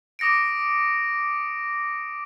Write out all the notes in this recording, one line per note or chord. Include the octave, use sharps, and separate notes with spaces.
D6 D#6 A#6 C#7 D7